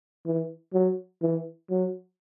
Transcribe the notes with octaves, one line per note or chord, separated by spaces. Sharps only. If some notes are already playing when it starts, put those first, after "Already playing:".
E3
F#3
E3
F#3